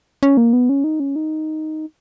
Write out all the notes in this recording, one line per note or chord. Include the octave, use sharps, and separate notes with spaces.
C#4
A#3
B3
C#4
D#4
C#4
D#4